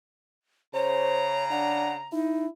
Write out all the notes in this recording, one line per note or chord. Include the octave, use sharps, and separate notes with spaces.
C#3 C5 C#5 A#5
D4 F#5
D#4 E4